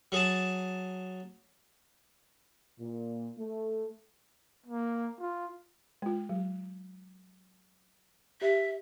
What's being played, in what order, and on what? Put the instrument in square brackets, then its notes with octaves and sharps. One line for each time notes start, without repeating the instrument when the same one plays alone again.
[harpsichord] F#3 G#4 A5
[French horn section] A#2
A3
[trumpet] A#3
F4
[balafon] G#3 F4
F#3
[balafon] G4 [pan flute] E5